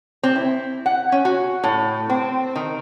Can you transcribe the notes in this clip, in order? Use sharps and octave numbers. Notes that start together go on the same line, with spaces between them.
C4
E4
F#5
C#4
F#4
A2
C4
D#3